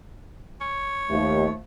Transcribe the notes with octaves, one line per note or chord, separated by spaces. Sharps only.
C#5
D#2 D#3 F3 A3